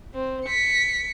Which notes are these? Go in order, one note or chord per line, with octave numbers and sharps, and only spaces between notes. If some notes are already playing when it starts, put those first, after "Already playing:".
C4
B6 C#7